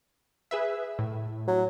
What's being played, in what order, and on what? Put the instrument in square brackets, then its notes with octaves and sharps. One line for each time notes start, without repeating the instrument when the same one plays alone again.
[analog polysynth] G#4 B4 E5
A2
[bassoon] F#3